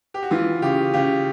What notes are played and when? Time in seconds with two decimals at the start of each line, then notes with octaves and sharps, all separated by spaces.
0.14 G4
0.23 F#4
0.31 E3 F4
0.62 C#3 G4
0.93 C#3 G4